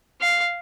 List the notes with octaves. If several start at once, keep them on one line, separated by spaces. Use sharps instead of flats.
F5